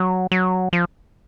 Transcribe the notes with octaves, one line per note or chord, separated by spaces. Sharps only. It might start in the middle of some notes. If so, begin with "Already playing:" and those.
Already playing: F#3
F#3
F3